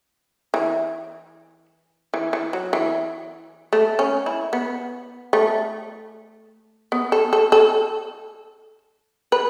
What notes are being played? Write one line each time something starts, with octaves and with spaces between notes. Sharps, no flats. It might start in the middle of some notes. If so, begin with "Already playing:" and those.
E3
E3
E3
F#3
E3
A3
C#4
E4
B3
A3
B3
A4
A4
A4
B4